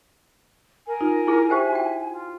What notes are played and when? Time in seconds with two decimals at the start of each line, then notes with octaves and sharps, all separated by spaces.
0.87 A#4 G#5
1.01 D#4 F4
1.27 E4 G#4
1.50 G4 C5 E5 G5
1.73 F#4 G5
2.12 F4